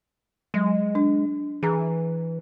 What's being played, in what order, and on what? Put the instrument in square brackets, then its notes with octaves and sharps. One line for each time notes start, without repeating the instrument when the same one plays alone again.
[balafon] F#3 [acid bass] G#3
[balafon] D4
[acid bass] E3 [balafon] G#4 A#5